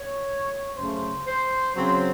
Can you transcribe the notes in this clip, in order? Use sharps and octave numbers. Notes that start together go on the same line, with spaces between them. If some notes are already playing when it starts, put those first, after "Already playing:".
Already playing: C#5
F#2 C#3 A3 C5
C5
C#3 F#3 C4 C5